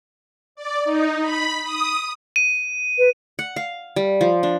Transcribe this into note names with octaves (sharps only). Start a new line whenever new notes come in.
D5
D#4
B5
D#6
D#7
B4
F#5
F5
G3
F3
D4